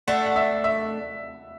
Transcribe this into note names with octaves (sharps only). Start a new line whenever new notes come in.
A3 D4 A4 F#5
F#5
E5
E5